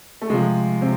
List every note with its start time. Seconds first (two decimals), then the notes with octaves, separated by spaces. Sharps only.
0.22 A3
0.30 C3 F3 G#3
0.82 C3 C4